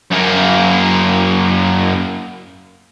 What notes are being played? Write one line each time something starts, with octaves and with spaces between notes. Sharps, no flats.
F#2 A#3